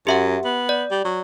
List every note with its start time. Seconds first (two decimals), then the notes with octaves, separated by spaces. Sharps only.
0.07 F#2 G4 E5 F#5
0.44 B3
0.69 D5
0.91 G3
1.05 F#3